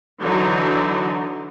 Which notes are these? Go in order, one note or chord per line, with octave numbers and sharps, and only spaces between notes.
D3 E3 F#3 D4 D#4